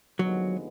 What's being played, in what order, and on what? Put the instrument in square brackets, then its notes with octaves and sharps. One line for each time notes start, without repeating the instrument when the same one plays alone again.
[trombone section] D#2 D3 F3 G#3 B3 [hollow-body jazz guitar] F#3